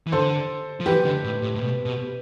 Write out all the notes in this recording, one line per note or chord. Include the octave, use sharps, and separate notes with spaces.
E3
D3 A4 C5
F3
E3 G4 B4
D3
A2
A2
A2
B2
B2